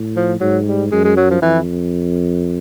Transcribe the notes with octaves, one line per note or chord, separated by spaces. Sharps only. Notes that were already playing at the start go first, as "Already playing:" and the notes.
Already playing: A2
F3
G#2 F#3
G3
F#2 G#3
G#3
F#3
F3
F2 E3